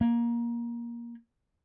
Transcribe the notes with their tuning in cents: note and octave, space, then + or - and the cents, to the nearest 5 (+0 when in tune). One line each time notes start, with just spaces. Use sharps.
A#3 +15